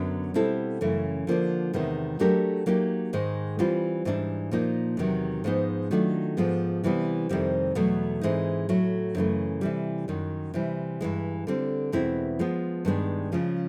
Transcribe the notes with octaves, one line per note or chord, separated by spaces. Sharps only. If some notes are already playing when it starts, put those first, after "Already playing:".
Already playing: F#2 D3 F#3 B3
B2 G3 C4 E4 A4
F#2 C#3 E3 A3 C#4
D3 F3 A#3 D4
E2 C3 D#3 G#3 B3
F#3 A3 D4 G4 A#4
F#3 A#3 D#4 G4
G#2 D#3 G#3
E3 G3 C4 F4
G#2 E3 G3 B3 D4
A#2 F3 A#3 D#4
E2 C3 D#3 F#3
G#2 F3 G#3 B3 D#4
D#3 F#3 A3 D4 F4
G#2 F3 G#3 B3
C3 E3 G3 B3
F2 C3 D#3 G3 C4
E2 B2 F#3 A3
G#2 E3 G#3 C4 D#4
A2 F#3 A3
F#2 C#3 E3 A3
C3 E3 G3
F#2 D#3 F#3
C3 E3 G3
G2 E3 G#3
D3 G3 C4
E2 B2 G#3 C4 E4
F3 G#3 B3
G2 D#3 G#3 B3 D4
C#3 F3 G#3 C#4